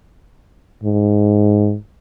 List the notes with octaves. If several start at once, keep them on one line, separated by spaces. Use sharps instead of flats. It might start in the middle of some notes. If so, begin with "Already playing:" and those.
G#2